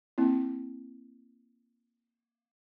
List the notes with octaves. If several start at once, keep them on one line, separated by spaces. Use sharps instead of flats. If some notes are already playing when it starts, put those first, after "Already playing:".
A#3 C4 E4